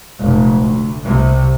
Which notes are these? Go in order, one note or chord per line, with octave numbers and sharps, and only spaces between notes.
F1 A#2
D2
C2 C3